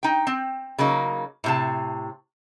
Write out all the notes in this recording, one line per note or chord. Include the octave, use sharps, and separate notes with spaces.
D#4 G5
C4
C#3 F#3 A#3 D#4
A2 C3 A5